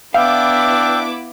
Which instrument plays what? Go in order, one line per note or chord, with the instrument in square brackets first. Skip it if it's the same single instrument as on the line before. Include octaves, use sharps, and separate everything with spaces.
[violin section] B3 E4 D6 [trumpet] D4 [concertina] E5 G5 [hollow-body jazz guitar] F5